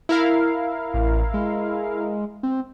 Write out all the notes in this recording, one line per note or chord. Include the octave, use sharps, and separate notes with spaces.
E4 A#4 F5
A1
G#3
C4